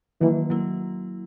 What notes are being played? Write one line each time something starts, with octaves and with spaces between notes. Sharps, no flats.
D#3 E3 F#3 A#3
F#3 A#3 E4